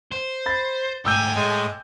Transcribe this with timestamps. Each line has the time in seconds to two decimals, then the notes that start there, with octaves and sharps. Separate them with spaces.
0.12 C5
0.46 B5 A6
1.05 G#2 A3 G5 G#5 A#5 D6 E6 G6
1.36 A2 G#3